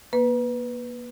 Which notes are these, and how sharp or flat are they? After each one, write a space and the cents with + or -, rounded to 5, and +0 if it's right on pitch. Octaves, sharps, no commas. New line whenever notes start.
A#3 +35 B4 +0